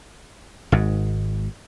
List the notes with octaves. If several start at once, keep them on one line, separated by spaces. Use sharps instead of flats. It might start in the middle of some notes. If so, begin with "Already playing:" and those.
G#1 G#2